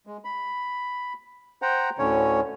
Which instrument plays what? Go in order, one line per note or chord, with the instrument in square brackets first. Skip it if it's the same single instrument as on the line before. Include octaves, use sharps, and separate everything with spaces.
[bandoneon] G#3
B5
C5 F#5 G5 A#5
D2 A2 D3 C#4 C#5